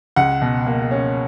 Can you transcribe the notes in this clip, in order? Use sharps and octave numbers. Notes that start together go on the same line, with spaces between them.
C#2 F#5
B2
A#3
C#4